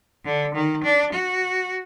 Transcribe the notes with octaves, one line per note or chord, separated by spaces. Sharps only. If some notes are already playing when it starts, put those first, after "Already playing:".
D3
D#3
D4
F#4